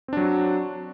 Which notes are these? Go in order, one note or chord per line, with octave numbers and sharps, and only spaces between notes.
F#3 C4 D4 F#4